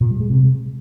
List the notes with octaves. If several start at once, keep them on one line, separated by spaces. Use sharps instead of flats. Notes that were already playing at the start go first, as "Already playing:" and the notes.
A#2
G3
G#3
C3